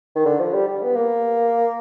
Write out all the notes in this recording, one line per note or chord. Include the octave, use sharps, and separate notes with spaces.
D#3
D3
F3
G3
G3
B3
A#3